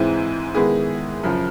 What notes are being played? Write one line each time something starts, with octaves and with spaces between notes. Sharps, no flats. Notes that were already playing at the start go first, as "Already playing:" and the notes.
Already playing: G#2 E3 G#3 C4 E4
D#3 G#3 B3 E4 G#4
F#2 C#3 F3